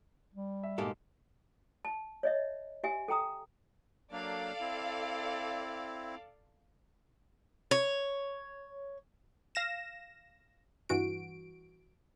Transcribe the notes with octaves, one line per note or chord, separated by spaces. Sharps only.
G3
E5
G#2 B2 G#3 A#3 G4 A4
A5
C#5 D#5 E5
G4 E5 G#5
A4 G5 A#5 D#6
F#3 A#3 D4 A4 D5 F5
C4 E4
C#5
F5 A#6 E7
G2 E3 F#4 D7